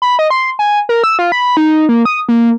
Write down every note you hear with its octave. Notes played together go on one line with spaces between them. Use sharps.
B5
D#5
C6
G#5
A#4
E6
F4
B5
D#4
A#3
D#6
A#3